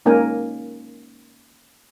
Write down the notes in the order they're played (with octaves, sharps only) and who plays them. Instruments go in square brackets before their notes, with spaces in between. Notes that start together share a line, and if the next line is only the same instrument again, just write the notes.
[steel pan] G#3 A#3 C#4 D#4 A#4 G#5